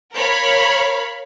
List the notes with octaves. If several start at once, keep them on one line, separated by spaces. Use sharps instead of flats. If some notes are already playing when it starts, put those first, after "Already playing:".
A#4 C#5 F5 B5